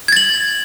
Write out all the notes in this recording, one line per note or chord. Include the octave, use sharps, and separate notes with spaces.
G#6 A6 F#7